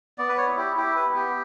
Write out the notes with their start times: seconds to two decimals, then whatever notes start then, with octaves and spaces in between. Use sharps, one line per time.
0.18 B3 D5
0.29 B4
0.38 C#5
0.47 E4
0.57 G4
0.76 E4 G4
0.96 B4
1.06 B3
1.15 G4